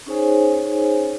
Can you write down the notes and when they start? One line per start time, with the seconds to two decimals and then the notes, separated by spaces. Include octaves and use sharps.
0.06 C#4 D#4 G#4 C5 C#5 G#5